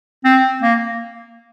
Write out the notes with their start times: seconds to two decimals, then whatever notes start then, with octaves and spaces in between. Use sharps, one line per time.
0.25 C4
0.63 A#3